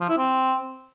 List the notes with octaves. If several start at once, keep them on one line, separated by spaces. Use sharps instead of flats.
F3
E4
C4